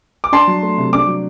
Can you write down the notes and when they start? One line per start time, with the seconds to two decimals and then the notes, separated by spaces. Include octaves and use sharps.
0.24 D6
0.32 D4 A5 C6
0.47 F#3
0.63 A3
0.77 C3
0.93 D4 D6
1.07 F#3